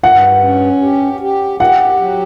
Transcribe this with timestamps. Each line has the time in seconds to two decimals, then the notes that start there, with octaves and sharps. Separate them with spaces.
0.03 G2 F#5
0.43 C#4
0.82 G4
1.21 G4
1.60 G4 F#5
1.99 F#3